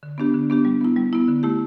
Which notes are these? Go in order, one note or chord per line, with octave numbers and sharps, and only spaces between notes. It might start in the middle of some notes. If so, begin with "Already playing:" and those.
D3
B3 D4 G4
D3
B3 D4 G4
G3
B3 E4
G3
B3 E4
D3
A3 E4 G4